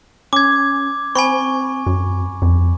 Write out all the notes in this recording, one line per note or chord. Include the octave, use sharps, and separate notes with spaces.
C#4 D6 G#6
C4 G#5 B5 C#6
F#2
F2